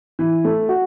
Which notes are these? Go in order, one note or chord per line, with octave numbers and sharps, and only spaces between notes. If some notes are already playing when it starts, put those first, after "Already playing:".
E3
A3
F#4